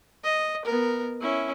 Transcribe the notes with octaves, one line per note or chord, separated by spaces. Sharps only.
D#5
B3 A#4
C#4 E4